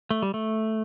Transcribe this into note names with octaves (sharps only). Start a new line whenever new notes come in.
A3
G3
A3